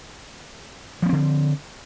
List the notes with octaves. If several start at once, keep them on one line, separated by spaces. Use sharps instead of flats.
D3 F3 B3 C4